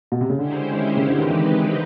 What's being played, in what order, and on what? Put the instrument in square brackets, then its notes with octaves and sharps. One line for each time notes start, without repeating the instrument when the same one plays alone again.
[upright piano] B2
C3
C#3
[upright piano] D3 [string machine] G#3 C#4 E4 G4 C5
[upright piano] D#3
C#3
[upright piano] D3 [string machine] G#3 C4 D#4 G4 B4
[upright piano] D#3
E3